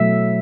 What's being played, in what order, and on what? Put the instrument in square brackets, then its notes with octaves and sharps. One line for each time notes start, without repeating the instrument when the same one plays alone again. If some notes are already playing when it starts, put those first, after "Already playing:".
Already playing: [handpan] B2 F#3 A3 E5